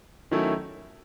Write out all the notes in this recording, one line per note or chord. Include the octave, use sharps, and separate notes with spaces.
D#3 F#3 A3 C#4 E4